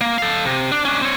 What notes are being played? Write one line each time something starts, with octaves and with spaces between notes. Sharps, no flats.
A#3
A4 F5
C3
D4
C#4 D4
C4 C#5